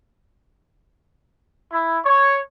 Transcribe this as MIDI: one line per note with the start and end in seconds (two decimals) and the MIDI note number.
1.72 2.00 64
2.05 2.40 73